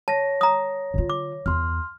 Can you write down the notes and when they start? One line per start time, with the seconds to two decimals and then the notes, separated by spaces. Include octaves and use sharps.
0.08 C#5 A5 A#6
0.41 A#5 D#6
0.94 D3 F4
1.10 D6
1.46 E2 C6 F6